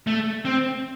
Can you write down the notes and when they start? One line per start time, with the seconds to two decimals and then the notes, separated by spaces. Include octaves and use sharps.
0.07 A3
0.45 C4